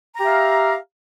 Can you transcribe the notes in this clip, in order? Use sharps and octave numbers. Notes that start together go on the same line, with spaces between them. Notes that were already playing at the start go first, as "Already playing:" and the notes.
G4 E5 F5 A#5